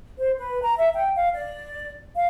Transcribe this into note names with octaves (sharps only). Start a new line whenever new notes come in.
C5
B4
A#5
E5
G5
F5
D5
F5